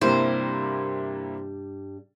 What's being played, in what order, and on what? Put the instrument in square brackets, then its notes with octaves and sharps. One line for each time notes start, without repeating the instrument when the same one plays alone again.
[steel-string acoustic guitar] G2 G3 [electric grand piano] C3 A#3 E4 [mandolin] C5